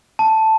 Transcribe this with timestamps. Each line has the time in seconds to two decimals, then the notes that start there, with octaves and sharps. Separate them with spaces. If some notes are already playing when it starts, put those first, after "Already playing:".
0.19 A5